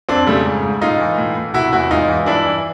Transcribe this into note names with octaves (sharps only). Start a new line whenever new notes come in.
F2 C4 D4
C#3 G3 A3
G#2
G#2
A2 D#4 F4
E3
A2
A2
C3 E4 F#4
E2 E4 F#4
G#2 D#4 F4
E3
G2 D4 E4
E3